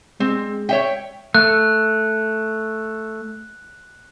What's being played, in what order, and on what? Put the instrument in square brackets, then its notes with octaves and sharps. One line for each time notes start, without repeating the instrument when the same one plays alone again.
[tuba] G#3 [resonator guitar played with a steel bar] C4
[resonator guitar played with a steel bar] C#5 E5 G5
[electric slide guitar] A3 [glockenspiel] F#6